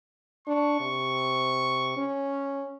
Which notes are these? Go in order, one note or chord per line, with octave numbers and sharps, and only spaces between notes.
D4 C#6
C3
C#4